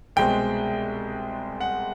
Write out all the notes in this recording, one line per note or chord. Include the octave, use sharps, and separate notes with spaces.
C2 B2 G#3 C4 G5
F#5